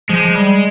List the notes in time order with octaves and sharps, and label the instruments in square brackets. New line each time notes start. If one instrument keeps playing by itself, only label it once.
[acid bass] F3 [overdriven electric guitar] G#3
[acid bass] F3
G3